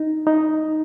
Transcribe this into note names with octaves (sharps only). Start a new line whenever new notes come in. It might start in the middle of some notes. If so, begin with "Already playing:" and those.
Already playing: D#4
D#4